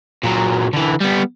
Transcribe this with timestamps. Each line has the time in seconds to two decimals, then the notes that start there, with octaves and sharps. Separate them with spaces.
0.23 A#2 F#3
0.73 D3 E3
1.00 G3 B3